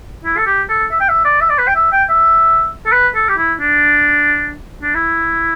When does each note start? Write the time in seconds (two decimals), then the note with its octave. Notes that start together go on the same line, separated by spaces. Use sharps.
0.24 E4
0.37 A4
0.46 G4
0.69 A4
0.91 E5
1.00 G5
1.09 E5
1.25 D5
1.41 E5
1.50 D5
1.58 B4
1.68 G5
1.75 E5
1.92 G5
2.09 E5
2.86 A4
2.92 B4
3.15 A4
3.29 G4
3.38 E4
3.60 D4
4.82 D4
4.95 E4